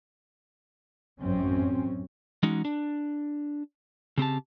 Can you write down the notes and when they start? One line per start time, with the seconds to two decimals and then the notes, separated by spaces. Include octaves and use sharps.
1.19 A1 F#2 C4 C#4
2.43 E3 G#3 C#4 D#4 F#4
2.65 D4
4.18 C#3 C4 G4 A5